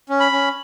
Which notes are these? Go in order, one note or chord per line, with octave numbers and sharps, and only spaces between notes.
C#4
B5
C#4